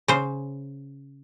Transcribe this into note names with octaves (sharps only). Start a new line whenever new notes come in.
C#3 C5